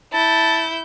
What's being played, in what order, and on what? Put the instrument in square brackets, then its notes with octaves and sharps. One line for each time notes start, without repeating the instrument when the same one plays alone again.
[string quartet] E4 G6 [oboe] A5